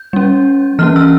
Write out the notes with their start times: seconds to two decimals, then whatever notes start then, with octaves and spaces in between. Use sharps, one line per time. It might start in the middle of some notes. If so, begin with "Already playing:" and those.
Already playing: G6
0.13 G3 C#4
0.79 E3 A#3 C#4 F6
0.96 E6